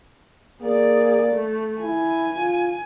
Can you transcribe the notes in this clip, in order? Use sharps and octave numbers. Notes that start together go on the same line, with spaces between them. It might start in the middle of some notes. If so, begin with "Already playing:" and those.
A#3 G#4 D5
A3
E4 G#5
F4